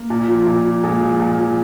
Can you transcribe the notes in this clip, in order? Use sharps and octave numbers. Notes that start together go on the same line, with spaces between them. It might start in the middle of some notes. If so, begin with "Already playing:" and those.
Already playing: A#3
A#2
F3
A#2
F3
A#2 G#3
F3
A#2
F3